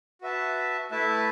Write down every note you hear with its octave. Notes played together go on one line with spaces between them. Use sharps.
F#4 B4 E5 A5
A3 E4 B4 E5 A5